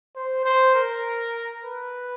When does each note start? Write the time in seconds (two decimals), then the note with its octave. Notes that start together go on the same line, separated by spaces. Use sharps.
0.15 C5
0.45 C5
0.75 A#4
1.64 B4